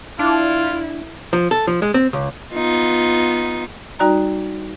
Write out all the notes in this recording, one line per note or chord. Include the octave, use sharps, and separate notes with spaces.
D4 E4 F4
F3
A4
F3
G#3
C4
C#2
B3 D#4 F4
G3 D#4 F#4 D5 A#5